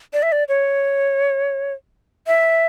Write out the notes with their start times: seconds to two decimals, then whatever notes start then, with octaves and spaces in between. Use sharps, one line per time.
0.13 D5
0.23 E5
0.32 D5
0.49 C#5
2.27 E5